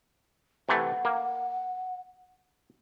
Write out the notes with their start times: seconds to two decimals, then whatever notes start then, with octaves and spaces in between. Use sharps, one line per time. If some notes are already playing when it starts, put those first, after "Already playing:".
0.69 C3 E3 A3 F#5
1.05 A#3